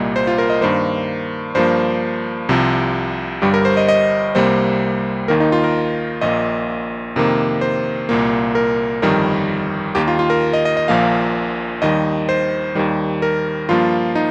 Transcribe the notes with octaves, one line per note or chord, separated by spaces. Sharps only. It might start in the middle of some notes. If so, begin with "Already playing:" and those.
Already playing: C2 A#2 G3 A#3 D#5
C5
F4
A#4
D#5
G2 D#3 A#3 C5
G2 F3 A#3 C5
C2 C3 F3
G1 G2 G3 G4
A#4
C5
D#5
D#5
C2 C3 G3 A#3 C5
D#2 D#3 A#3 A#4
D#4
F4
A#4
A#1 A#2 A#3 D#5
F2 C3 D#3 A#3
C5
C2 A#2 A#3
A#4
G1 F2 D#3 G3 A#4
D#2 D#3 A#3 G4
F4
F4
A#4
D#5
D#5
D#5
A#1 A#2 F3 A#3 F5
D#2 D#3 G3 D#5
C5
D#2 D#3 G3
A#4
G2 F3 A#3 F4
D#4